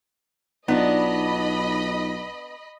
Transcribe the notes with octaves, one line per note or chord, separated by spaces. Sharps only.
B1 B3 D4 D#4 F4 D#5 B5